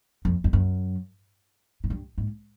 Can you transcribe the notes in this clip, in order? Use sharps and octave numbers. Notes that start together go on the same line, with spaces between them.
F2
F2
F#2
G#2
G2
G#2